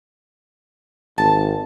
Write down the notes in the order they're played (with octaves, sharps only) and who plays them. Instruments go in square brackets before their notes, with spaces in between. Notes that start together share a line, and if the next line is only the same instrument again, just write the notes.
[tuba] G#1 [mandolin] A5